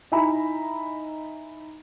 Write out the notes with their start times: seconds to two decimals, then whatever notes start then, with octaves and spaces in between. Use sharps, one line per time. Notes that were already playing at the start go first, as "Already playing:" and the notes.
0.12 D#4 E4 E5 G#5 A#5 B5